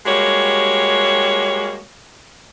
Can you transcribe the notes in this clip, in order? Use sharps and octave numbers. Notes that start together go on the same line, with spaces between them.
G3 G#3 A#3 F#4 G4 C#5